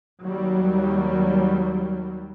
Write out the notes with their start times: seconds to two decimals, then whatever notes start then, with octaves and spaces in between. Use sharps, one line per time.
0.21 D#2 F#3 G3